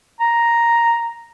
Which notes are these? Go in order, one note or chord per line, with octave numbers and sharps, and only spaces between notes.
A#5